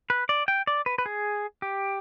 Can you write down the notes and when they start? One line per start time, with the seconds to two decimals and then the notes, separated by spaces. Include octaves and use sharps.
0.10 B4
0.29 D5
0.48 G5
0.67 D5
0.86 B4
0.98 B4
1.06 G#4
1.62 G4